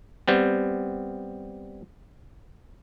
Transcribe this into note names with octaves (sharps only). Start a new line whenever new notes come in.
G3 B3 C4